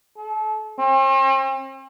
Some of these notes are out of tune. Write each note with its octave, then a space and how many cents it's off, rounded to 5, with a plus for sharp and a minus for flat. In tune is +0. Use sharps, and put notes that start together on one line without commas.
A4 -35
C4 +45